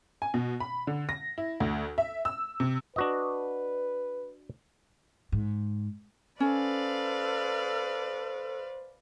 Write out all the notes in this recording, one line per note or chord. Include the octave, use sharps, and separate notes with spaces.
G#5
B2
B5
D3
A#6
E4
D2
E5
E6
C3
D4 F#4 B4 D#5
G#2
C#4 A4 B4 C5 D5 F5